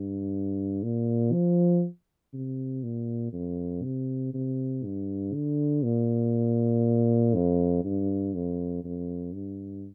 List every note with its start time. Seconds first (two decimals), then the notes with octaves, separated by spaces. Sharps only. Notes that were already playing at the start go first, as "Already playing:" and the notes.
Already playing: G2
0.83 A#2
1.33 F3
2.33 C3
2.84 A#2
3.33 F2
3.83 C3
4.34 C3
4.84 G2
5.34 D3
5.84 A#2
7.35 F2
7.85 G2
8.34 F2
8.84 F2
9.35 G2